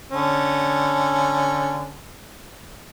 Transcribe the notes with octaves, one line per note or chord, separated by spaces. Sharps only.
D3 C#4